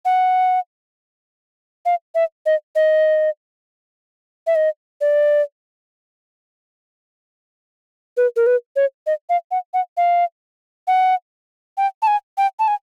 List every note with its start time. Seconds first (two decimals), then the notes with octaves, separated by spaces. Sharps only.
0.05 F#5
1.85 F5
2.15 E5
2.46 D#5
2.75 D#5
4.47 E5
4.55 D#5
5.01 D5
8.17 B4
8.36 A#4
8.46 B4
8.76 C#5
9.07 D#5
9.29 F5
9.51 F#5
9.74 F#5
9.97 F5
10.87 F#5
11.77 G5
12.02 A5
12.07 G#5
12.37 G5
12.59 A5
12.68 G#5